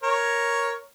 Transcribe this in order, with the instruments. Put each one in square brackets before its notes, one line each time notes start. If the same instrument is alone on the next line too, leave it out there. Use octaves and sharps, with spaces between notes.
[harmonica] A#4 C#5